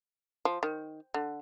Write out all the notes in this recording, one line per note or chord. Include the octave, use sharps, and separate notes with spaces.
F3
D#3
D3